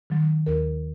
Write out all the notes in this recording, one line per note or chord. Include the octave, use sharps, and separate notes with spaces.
D#3 F#3
D#2 A#4